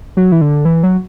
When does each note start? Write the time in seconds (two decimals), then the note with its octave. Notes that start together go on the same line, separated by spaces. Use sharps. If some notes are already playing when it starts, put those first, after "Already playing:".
0.17 F#3
0.32 E3
0.41 D3
0.65 E3
0.83 F#3